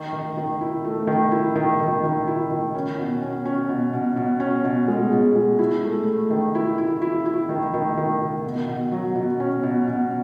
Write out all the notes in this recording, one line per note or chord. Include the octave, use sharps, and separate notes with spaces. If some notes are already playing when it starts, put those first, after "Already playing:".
Already playing: D#3
D#3
D#3
E4
A3
D#3
E4
D#3
D#3
D#3
E4
D#3
C#4
B2
C#4
C#4
B2
B2
B2
C#4
B2
G#3
B2
G#3
E4
A3
A3
D#3
E4
E4
E4
E4
D#3
D#3
D#3
D#3
B2
B2
F#3
B2
C#4
B2
B2